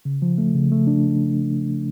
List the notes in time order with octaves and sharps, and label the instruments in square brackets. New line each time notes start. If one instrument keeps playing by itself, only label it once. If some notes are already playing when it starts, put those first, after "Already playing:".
[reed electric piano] C#3
F3
A3
C#3
A3
D4